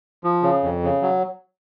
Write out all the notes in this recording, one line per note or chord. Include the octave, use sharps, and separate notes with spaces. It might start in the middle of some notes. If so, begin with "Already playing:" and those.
F3
C#3
F2
C#3
F#3